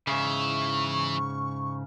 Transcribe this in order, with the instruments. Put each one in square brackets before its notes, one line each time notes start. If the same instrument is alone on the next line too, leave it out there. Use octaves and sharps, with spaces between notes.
[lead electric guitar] G#2 C#3 [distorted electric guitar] E3 E5 [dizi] C#6